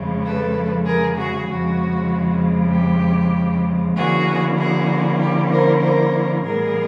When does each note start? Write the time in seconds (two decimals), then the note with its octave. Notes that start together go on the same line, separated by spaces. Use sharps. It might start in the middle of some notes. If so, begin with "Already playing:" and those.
Already playing: F2 C#3 F3 G#3
0.24 A4 B4
0.86 G#4 A#4
1.17 F#4 G#4
1.48 F2 C#3 F3 G#3 F#4
2.72 G4
3.96 D3 F3 A#3 C#4 E4 F#4 G#4
4.58 F#4 G#4
5.20 G4
5.52 A#4 C5
5.82 A#4 C5
6.43 A2 E3 G3 B3 G#4 A#4